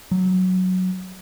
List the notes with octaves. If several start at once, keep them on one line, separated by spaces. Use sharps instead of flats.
F#3